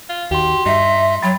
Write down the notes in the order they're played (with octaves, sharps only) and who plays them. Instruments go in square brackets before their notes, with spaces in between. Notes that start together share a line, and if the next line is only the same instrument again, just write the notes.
[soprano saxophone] F4
[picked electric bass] D#2 [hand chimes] F#4 C6 [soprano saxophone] G4
[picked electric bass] G2 [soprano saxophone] D#4 [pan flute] E5 [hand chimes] C6
[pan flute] F#3 [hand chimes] G5 B5 A6